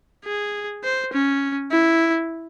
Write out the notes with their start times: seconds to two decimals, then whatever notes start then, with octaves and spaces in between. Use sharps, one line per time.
0.25 G#4
0.84 C5
1.13 C#4
1.71 E4